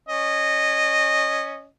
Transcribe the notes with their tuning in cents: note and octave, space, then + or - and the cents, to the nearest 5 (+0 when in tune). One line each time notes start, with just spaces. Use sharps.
C#4 +0 D#5 -15